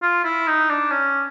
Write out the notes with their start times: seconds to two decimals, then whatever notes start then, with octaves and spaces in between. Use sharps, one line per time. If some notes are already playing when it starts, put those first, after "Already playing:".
0.02 F4
0.24 E4
0.47 D#4
0.69 D4
0.92 C#4